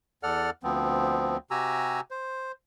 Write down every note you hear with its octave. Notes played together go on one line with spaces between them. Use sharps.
E2 A4 D5 F#5 F6
D2 F3 B3 C4
C3 F#4 G4 G#5 A#5 E6
C5